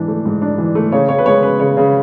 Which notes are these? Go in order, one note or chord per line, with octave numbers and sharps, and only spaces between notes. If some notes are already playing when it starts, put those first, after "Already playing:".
Already playing: G#2 E3 D4
A3
G#2
D4
E3
A3
C#3 C#5
C#3 C#5
B4
G#3 C#5
C#4 B4
C#3 C#5
C#3